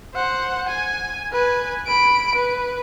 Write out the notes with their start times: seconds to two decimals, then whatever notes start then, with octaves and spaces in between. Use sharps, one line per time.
0.14 C5 F#5
0.68 G#5
1.33 B4 G#5
1.87 B5 D7
2.35 B4